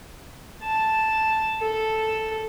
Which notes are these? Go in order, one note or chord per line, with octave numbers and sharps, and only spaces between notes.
A5
A4